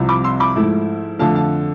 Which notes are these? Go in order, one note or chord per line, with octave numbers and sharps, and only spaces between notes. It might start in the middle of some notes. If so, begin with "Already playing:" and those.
Already playing: C2 C3 F3
B5 D6
C6 E6
B5 D6
G#2 F3 A3 E4
F2 D3 A3 F5 A5
F5 A5